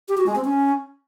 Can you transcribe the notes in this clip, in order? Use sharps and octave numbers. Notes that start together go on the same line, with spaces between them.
G4
F#4
G#3
C4
C#4